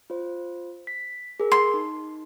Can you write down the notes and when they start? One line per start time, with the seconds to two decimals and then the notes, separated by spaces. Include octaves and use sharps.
0.10 F4 C5
0.87 B6
1.40 G#4 A#4
1.52 C6
1.74 D#4